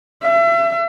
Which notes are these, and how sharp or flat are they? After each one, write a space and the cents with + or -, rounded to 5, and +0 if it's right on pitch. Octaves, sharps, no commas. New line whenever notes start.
E5 +35